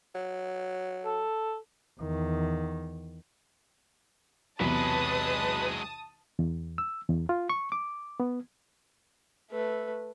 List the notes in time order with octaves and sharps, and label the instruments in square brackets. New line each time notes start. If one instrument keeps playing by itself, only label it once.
[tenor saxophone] F#3
[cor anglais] A4
[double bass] E2 D#3
[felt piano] B1 E2 C3 [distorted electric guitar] F#3 G#3 [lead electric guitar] B4 [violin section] A5 D#6
[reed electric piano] E2
E6
E2
F4
C#6
D6
B3
[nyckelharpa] A3 B4